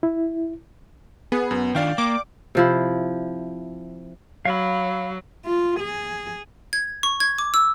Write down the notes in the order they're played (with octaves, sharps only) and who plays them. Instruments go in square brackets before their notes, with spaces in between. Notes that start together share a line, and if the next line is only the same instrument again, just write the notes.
[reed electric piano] E4
[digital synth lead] B3 [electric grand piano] G#4
[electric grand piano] F#2
[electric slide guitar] D#3 D4 F4 [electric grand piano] D5 F5 G5
[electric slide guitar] A#3 [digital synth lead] D6
[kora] C3 F3 E4
[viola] F#3 [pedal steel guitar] F5 B5
[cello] F4
G#4
[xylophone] G#6
C#6
G#6
D6
E6